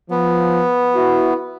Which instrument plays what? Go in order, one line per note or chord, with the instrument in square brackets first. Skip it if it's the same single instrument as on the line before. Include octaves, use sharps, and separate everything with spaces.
[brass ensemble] F3 [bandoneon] B3
[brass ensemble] E4 F#4